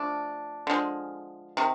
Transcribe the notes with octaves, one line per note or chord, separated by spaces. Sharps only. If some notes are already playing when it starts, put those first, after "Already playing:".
Already playing: F3 A3 D4
D3 F3 G#3
C3 D#3